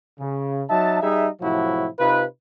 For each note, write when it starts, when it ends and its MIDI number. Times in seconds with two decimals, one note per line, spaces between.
0.20 0.63 49
0.70 1.00 54
0.70 1.00 63
0.70 1.00 76
0.70 1.00 81
1.02 1.27 55
1.02 1.27 63
1.02 1.27 68
1.02 1.27 76
1.41 1.87 45
1.41 1.87 48
1.41 1.87 53
1.41 1.87 54
1.41 1.87 64
1.41 1.87 66
2.00 2.24 48
2.00 2.24 63
2.00 2.24 65
2.00 2.24 71